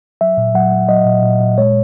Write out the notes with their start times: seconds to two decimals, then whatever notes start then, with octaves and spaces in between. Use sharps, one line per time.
0.21 F#3 E5
0.38 A#2
0.55 F#3 F#5
0.72 F#3
0.89 F#3 D#5
1.06 A#2
1.23 A#2
1.40 A#2
1.58 G#3 C#5